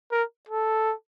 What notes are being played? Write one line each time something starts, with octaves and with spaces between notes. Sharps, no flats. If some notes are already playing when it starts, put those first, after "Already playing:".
A#4
A4